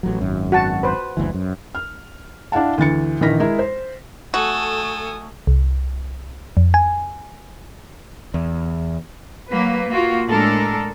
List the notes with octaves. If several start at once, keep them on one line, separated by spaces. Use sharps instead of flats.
A1 F#3
G#1 F#2
F#4 F#5 A5
B4 C5
F#1 D2 E3
F#2
F6
D4 E4 F5 F#5 A5
D2 E3 A6 C#7
A#1 D#3 E3 F6 A#6 B6
G#3 E4 G#4 A#4
C5
A3 F#4 A4 G#5 D#6
C2
F2
G#5
E2
F#3 A#3 B4
A#3 F4 F#4
A2 G#3 D4 A4 A#4